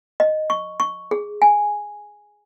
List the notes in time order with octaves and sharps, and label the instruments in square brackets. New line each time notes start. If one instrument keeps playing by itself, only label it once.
[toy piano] D#5
C#6
C#6
G#4
G#5